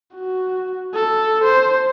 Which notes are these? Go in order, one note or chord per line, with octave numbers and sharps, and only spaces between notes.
F#4
A4
C5